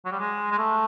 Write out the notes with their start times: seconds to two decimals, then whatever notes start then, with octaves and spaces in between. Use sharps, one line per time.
0.05 F#3
0.12 G3
0.20 G#3
0.52 G#3
0.58 A3